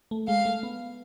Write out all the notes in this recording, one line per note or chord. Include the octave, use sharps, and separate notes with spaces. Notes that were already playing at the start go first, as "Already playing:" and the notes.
A3
G#3 F5
A3
B3